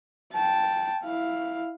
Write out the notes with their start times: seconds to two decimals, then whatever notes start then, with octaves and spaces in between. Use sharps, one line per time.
0.33 G5 A5
1.04 E4 F5